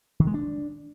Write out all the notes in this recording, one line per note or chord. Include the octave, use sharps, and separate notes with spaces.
D#3
G#3
D4